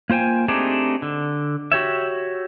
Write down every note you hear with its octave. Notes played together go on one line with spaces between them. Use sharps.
A#3 F4 C5 G5 G#5
A3 C4 D4 D#4 G4 G#4
D3
F#4 G4 C#5 E5